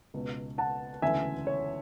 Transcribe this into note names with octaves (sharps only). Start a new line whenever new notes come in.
C#2 B2
F#5 A5
E1 D2 C#3 E3 E5 G#5
C#5